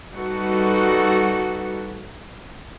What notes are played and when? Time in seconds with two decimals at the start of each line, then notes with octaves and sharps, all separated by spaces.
0.12 G3 D#4 F#4 A4 B4